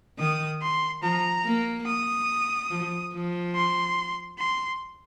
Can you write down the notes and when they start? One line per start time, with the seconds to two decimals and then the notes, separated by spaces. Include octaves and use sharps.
0.19 D#3 D#6
0.62 C6
1.02 F3 A#5
1.45 A#3
1.86 D#6
2.70 F3
3.13 F3
3.55 C6
4.39 C6